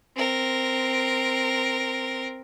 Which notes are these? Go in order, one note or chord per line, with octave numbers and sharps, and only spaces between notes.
C4 A#4